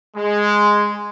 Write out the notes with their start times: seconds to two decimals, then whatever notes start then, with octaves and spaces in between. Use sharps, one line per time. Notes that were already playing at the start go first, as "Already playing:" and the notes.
0.17 G#3